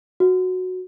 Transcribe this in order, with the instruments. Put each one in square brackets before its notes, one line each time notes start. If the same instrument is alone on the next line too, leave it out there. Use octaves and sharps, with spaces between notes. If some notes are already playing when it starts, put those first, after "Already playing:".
[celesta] F#4